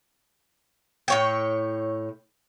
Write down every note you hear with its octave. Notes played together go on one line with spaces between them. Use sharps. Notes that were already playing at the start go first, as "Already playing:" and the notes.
A2 C#5 G5